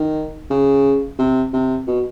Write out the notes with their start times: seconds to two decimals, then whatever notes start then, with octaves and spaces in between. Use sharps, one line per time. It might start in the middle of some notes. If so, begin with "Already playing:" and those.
Already playing: D#3
0.50 C#3
1.19 C3
1.53 C3
1.87 B2